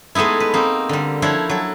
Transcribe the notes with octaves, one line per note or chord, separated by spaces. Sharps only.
G#3 A3 B3 D#4 E4
B4
A#3 C4 D#4
D3 G3
F3 D4 E4 C#5
F#3 A4